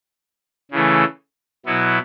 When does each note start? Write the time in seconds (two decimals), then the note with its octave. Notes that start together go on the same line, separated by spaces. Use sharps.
0.71 C#3 E3 A3
1.66 B2 F#3 B3 E4